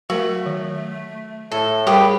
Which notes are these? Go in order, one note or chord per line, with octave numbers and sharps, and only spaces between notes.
F#3 A3 F#4 A#4
D#3
A2 A4
G3 G4 G#4 A#4 B4 B5 D#6